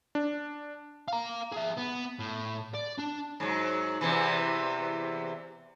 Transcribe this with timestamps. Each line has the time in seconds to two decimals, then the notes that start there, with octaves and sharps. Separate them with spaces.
0.15 D4
1.08 F5 A#5
1.52 G#4 E5
1.77 B3
2.19 A2
2.75 D5
2.99 D4
3.40 G#2 F#3
4.01 E2 C3 E3